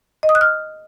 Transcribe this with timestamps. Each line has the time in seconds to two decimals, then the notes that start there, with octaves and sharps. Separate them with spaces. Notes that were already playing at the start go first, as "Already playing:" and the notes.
0.23 D#5
0.29 D#6
0.35 F#6
0.41 F6